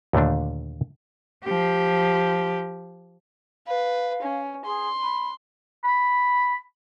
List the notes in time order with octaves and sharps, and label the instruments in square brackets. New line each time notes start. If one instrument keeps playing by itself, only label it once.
[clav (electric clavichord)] D#2 A#2 D3 A3 D4
[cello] F3 G4
[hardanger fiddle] B4 [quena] F5
[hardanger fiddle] C#4
[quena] G#4 [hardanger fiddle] C6
[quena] B5
[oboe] B5